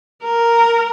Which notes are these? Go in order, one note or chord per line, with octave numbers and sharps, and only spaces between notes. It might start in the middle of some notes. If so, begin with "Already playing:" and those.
A#4